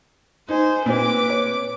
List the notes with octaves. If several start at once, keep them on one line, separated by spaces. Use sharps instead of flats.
D#4 C5 G#5
A#2 C4 B4 D6
C#5